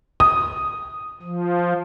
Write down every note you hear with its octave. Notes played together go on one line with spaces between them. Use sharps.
D#6
F3